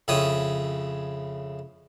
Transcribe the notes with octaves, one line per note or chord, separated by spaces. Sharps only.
F2 C#3 E4 C#5 G5 D#6